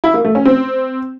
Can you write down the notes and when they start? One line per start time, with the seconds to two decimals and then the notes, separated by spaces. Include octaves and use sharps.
0.04 E4
0.14 A#3
0.25 A3
0.35 C#4
0.45 C4